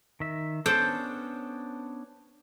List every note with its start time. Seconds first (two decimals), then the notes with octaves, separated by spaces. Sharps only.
0.20 D#3 E5
0.66 B3 C#4 D4 A4 C5 G5